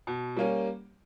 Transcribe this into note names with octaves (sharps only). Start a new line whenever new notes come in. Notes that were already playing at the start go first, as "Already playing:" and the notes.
B2
G3 A#3 C#4